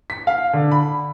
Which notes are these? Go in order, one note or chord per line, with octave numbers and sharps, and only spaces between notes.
B6
F5
D3
B5